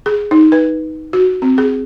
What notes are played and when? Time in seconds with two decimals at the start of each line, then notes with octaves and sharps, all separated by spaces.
0.06 G#4
0.31 D#4
0.52 B4
1.13 F#4
1.42 C4
1.58 G#4